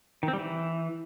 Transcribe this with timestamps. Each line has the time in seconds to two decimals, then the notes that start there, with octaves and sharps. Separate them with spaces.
0.23 D#3
0.28 C4
0.33 G3
0.39 E3